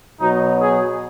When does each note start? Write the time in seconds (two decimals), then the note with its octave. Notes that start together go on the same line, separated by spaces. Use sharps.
0.21 B2 F#3 D#4
0.62 G#4